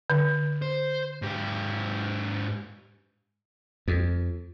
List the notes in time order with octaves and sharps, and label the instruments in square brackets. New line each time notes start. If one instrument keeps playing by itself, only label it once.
[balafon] D3
[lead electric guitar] C5
G#2 G4
[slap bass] F2